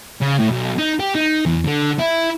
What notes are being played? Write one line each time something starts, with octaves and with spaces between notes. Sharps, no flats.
C#3
A2
B1
D#4
G4
D#4
E2
D3
E4